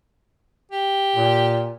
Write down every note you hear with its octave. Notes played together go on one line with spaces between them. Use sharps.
G4
A#2